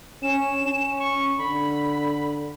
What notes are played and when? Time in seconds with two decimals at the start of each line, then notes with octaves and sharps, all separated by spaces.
0.23 C#4 E7
0.63 C#4
0.99 C#6
1.38 D3 B5